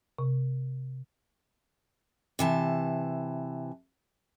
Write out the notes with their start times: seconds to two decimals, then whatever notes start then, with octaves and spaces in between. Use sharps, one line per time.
0.19 C3
2.39 C3 E3 A5